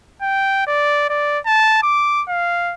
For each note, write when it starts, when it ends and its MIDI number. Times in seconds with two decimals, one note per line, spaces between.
0.22 0.67 79
0.67 1.07 74
1.09 1.39 74
1.46 1.82 81
1.83 2.23 86
2.29 2.74 77